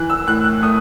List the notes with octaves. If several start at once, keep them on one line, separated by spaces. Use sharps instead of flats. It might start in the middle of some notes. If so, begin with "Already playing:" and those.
Already playing: E3 F#6
E6
A2 F#6
F#6
A3 D#6